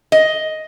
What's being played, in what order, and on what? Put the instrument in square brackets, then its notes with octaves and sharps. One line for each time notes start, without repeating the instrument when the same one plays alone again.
[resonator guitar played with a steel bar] D#5